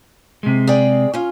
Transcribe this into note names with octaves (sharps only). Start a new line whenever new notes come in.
C3 G#3
G#4 D5 G5
C#4 F4